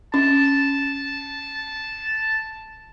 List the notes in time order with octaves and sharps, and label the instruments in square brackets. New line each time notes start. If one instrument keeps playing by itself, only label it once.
[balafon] C#4 [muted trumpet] A5